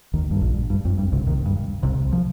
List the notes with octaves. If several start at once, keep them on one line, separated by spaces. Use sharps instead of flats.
D#2 D#3
G2
A#1 A#2
G2
F2
G2
C2 C3
D#2 D#3
G2
C2 C3
F3